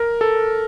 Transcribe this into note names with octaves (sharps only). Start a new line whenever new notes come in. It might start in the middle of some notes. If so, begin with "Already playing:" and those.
Already playing: A#4
A4